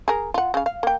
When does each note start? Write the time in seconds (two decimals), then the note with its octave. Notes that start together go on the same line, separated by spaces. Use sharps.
0.08 G#4 A#4
0.34 F4 F#5
0.54 C#3 F5
0.66 F5
0.83 A#3 G5